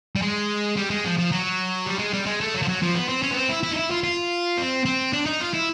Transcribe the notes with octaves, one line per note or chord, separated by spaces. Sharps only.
G3
G#3
G3
G#3
F3
F3
F#3
G3
G#3
G3
G#3
A3
F#3
F3
F#3
F3
B3
C4
C#4
B3
C4
E4
E4
D#4
E4
F4
F4
C4
C4
D4
D#4
F4
E4